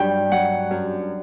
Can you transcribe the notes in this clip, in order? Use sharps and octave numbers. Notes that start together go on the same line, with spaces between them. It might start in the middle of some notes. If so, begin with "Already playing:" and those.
Already playing: G2 F#3 G5
F#3 F#5
F#2